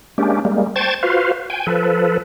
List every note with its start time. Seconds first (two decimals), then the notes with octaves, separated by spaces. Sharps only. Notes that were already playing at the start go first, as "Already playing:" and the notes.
0.18 G#3 A#3 C#4 D4 G4
0.45 G3 G#3 A#3
0.76 C5 G5 A5 C#6 G#6 A6
1.03 F4 F#4 B4 C5 F5
1.50 G5 G#5
1.67 F3 A4 B4